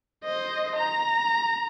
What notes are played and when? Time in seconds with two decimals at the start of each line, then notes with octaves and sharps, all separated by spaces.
0.24 C5 D#5
0.75 A#5